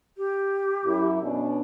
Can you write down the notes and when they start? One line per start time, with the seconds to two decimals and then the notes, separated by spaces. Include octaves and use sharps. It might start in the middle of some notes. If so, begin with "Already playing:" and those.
0.17 G4
0.85 F#2 E4
1.21 B2 C#4 D4